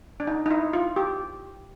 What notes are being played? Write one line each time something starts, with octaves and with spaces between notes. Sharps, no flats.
D4
D#4
D#4
E4
F4
G4